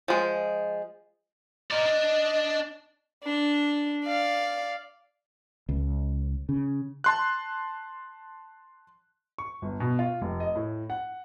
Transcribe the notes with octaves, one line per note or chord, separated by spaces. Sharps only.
F3 G#3
A#4 D5 D#5
D4
D4
D5 F5
C#2
C#3
A5 C6 F#6
C#6
G1
B2
F4
F1
D#5
A2
F#5